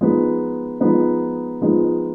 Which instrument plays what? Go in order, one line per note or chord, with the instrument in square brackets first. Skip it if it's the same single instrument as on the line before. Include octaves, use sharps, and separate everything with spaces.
[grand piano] F3 G#3 B3 D#4
F3 G#3 B3 D#4
F3 G#3 B3 D#4